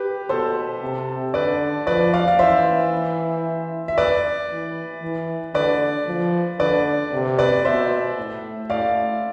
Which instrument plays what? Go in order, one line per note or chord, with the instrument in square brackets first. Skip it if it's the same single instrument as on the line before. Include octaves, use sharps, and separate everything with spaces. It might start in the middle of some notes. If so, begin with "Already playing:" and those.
Already playing: [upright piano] G4 B4
[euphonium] B2 [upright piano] A4 C5
[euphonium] C3
[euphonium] D3 [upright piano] B4 D5
[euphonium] F3 [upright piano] B4 D5
[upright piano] D5 F5
F5
[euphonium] E3 [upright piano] C5 E5
[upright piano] E5
B4 D5
[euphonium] E3
E3
[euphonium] D3 [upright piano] B4 D5
[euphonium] F3
[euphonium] D3 [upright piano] B4 D5
[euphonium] C3
[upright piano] B4 D5
[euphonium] B2 [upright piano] C5 E5
[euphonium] A2
[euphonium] A2 [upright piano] D5 F5